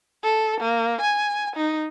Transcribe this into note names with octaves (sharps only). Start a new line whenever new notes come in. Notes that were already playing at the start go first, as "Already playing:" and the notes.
A4
A#3
G#5
D#4